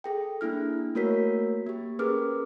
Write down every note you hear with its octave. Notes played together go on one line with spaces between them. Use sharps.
G#4 A4 G5
A#3 D4 E4 F6
A3 A#3 F#4 A#4 C#5 B6
A#3 G4
C#4 G#4 A#4 B4 D6 F6